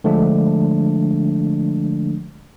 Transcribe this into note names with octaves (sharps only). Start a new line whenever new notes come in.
D3 F3 G#3 A3 D4